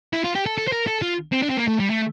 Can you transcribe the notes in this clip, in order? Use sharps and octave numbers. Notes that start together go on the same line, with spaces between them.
E4
F4
G4
A4
A4
C5
A#4
A4
F4
C4
D4
C4
A#3
A3
G3
A3